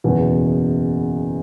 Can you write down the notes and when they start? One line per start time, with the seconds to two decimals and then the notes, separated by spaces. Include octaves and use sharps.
0.04 F#1 E2 B2